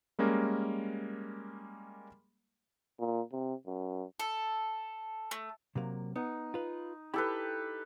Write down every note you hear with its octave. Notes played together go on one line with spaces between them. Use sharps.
G3 G#3 A#3 C#4 A#4
A#2
C3
F#2
A4
A3
C3 F#3 A#3
B3 D#4
F4 B4
E4 G4 A4 B4 B5